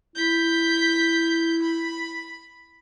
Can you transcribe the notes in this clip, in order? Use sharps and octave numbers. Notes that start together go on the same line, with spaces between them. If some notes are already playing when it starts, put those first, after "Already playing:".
E4 G6 B6
B5